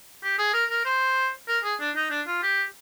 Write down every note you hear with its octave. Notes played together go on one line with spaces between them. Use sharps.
G4
G#4
A#4
A#4
C5
A#4
G#4
D4
D#4
D4
F4
G4